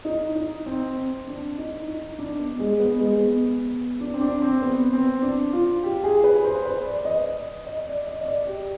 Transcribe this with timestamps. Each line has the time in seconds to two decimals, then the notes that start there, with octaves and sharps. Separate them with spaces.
0.05 D#4
0.35 D#4
0.66 C4
0.97 C4
1.27 D4
1.58 D#4
1.88 D#4
2.19 D4
2.39 B3
2.59 G#3
2.79 B3
2.99 G#3
3.20 B3
4.00 D4
4.14 C4
4.21 D4
4.42 C4
4.62 B3
4.93 C4
5.22 D4
5.53 F4
5.83 G4
6.04 G#4
6.24 B4
6.44 C5
6.65 B4
6.86 D5
7.05 D#5
7.67 D#5
7.87 D5
8.07 D#5
8.21 D#5
8.26 D5
8.47 G4